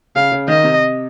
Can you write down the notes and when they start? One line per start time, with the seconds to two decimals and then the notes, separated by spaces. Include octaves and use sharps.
0.16 C#3 F5
0.32 C#3
0.48 D#3 D#5
0.63 C3